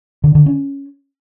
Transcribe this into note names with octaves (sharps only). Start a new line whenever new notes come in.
D3
D3
C#4